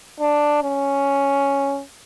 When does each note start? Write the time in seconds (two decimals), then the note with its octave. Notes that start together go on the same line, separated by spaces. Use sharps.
0.20 D4
0.64 C#4